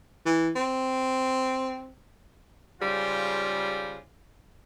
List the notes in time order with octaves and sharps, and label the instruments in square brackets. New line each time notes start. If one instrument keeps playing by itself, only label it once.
[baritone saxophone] E3
C4
[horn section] G#2 C#3 G3 F4